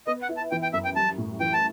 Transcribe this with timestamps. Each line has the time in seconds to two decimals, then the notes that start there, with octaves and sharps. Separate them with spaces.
0.07 B3 D#5
0.22 F#5
0.29 E4
0.37 A5
0.51 E3 G5
0.63 G5
0.73 F#2 E5
0.85 G5
0.96 G3 A5
1.18 A2
1.40 E3 G5
1.53 A5